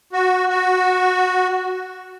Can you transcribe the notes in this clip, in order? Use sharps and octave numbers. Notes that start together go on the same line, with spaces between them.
F#4
F#4